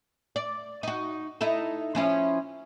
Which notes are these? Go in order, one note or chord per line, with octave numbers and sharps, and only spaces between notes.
D5
D#4 F#4
D#4 E4 A4
F3 C#4 E4